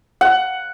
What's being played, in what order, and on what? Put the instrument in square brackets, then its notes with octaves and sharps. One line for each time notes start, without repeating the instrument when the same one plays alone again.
[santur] F#5